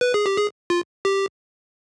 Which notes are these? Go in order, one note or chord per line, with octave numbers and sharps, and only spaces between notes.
B4
G#4
G4
G#4
F4
G4